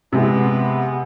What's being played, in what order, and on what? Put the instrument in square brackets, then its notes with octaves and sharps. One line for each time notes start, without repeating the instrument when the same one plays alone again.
[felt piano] C3 G#3 [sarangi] B3